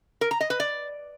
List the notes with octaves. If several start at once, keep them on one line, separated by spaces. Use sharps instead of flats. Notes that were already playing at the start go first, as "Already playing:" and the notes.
A#4
A#5
D#5
B4
D5